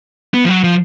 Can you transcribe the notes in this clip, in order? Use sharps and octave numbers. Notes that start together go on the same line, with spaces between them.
B3
F3
F#3
F3